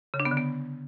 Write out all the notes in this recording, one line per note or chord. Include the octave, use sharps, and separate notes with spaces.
C#3
D4
B3
D3
B3